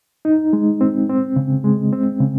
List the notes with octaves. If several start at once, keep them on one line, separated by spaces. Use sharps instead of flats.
D#4
G#3
C4
C4
C#3
G#3
C4
C#3